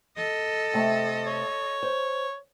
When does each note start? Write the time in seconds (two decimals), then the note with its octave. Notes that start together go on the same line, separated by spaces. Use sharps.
0.17 A4 D#5
0.74 C3 A3 A5
1.26 C#5
1.83 C5